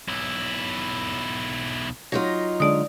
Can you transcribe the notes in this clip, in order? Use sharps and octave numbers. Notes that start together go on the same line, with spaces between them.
B1 E4
F#3 D#4 F4 A#6
D3 G#3 D4 D5 D#6